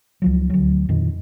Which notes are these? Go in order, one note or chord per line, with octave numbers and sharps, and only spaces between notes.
C#2 F3 F#3
D2 F#3
F2 A#2 D#3